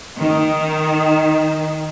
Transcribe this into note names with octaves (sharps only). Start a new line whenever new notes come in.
D#3 D#4